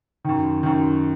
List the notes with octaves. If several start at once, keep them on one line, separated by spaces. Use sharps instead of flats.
F#2 D#3
F#2 D#3